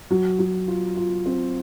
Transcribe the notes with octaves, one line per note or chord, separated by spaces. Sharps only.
F#3
F#3
F4
F4
C4